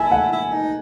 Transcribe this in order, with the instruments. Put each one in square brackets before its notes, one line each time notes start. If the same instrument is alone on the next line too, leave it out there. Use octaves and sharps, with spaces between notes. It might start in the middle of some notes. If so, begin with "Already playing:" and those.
Already playing: [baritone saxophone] E4 [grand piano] G#5 A5
[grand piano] F#5
[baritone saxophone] E4
D#4